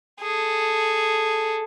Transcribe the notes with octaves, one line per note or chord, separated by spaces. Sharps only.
G#4 A4